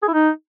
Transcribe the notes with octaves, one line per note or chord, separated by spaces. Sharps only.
G#4
E4
D#4